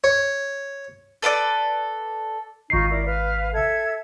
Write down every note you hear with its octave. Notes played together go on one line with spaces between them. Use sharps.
C#5
A4 B4 C5 D5
G#1 D#4 F4 C#6 C7
E4 A#4 D5
B4 F5
A4 E5 G#6